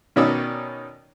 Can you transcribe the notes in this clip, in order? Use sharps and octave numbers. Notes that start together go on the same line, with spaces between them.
B2 D#3 C#4 D#4 D5 E6